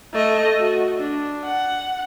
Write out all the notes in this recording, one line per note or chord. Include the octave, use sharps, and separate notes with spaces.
A3 D#5
F#4
D4
F#5